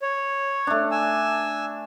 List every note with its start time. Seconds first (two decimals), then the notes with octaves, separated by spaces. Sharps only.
0.02 C#5
0.67 A3 D4
0.91 G#5 E6